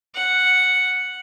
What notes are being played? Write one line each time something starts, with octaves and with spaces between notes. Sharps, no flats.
F#5